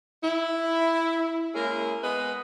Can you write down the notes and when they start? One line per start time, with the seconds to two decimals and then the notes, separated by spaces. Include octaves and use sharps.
0.22 E4
1.55 G#3 A#3 C#4 E4 G#4 A#4
2.03 G#3 B3 B4 D#5